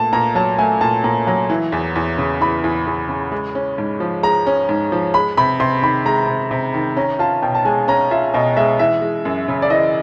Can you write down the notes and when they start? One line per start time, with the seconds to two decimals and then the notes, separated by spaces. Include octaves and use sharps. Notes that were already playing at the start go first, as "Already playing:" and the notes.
Already playing: A#2 A3 A5
0.13 A#2 A#5
0.35 F#3 A5
0.59 A3 G#5
0.81 A#2 A5
1.04 A#2 A#5
1.27 F#3 A#5
1.50 E3
1.72 E2
1.95 E2
2.18 C#3
2.40 E3 B5
2.64 E2
2.87 E2
3.09 C#3
3.32 G#3
3.55 C#4
3.78 G#2
4.00 F3
4.23 G#3 A#5
4.47 C#4
4.69 G#2
4.92 F3
5.14 G#3 B5
5.37 C3 B5
5.60 C3 C6
5.82 D#3 B5
6.05 G#3 A#5
6.28 C3
6.51 C3
6.74 D#3
6.97 C#4 A#5
7.19 F4 A5
7.42 B2 G5
7.55 A5
7.65 G#3 G#5
7.88 C#4 A#5
8.11 F4 E5
8.34 B2 D#5
8.57 G#3 E5
8.79 E3 E5
9.02 G#3
9.25 F#2
9.48 C#3
9.62 D5
9.70 E3 D#5